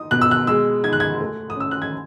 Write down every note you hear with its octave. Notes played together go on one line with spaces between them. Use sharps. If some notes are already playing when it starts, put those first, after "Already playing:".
Already playing: D#4 D#6
B2 F#6
E6
F#6
G#3 E6
D#4 G#6
F#6
G#6
A3
D#6
C#4 E6
F#6
G#6